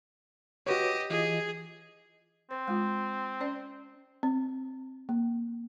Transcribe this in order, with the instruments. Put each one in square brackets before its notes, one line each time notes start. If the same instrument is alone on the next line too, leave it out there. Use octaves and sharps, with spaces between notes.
[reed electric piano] F#4 B4 C#5 [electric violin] G4 D#5
[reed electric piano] E3 F4 D#5 [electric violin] G#4
[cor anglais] C4 [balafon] C5
[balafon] G#3 F4
C#4 C5 D5
C4
A#3